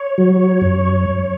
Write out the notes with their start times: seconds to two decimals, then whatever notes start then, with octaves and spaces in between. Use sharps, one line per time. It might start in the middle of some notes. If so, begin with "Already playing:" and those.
Already playing: C#5
0.18 F#3
0.61 F#2